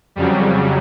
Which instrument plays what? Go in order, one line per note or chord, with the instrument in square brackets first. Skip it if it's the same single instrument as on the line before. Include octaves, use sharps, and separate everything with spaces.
[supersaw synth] F2 C#3 F#3 G3